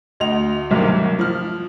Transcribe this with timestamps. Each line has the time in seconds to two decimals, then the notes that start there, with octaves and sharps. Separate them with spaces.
0.20 D2 D#5 F7
0.71 B1 G2 C3 D#3 F#3 A#3
0.88 B1
1.19 F3 F6